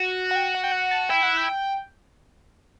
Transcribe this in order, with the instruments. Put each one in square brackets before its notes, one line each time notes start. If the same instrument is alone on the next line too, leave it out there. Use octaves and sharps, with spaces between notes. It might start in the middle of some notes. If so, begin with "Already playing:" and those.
Already playing: [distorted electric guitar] F#4
[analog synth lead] F#5
G5
F#5
G5
F#5
A5
[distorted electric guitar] E4 [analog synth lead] G5
[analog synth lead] F#5
G5